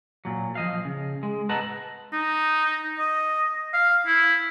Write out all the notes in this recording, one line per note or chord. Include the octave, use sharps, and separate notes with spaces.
A#2 F#3
F3 D#5 F5
C#3
G#3
B4 D#5 F#5 A5 A#5
D#4
D#5
F5
E4